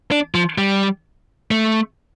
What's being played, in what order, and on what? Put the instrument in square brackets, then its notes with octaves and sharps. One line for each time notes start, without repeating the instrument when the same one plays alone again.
[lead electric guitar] D4
F3
G3
A3